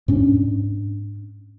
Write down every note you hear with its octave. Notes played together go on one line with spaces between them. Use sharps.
G#2 C#4 D4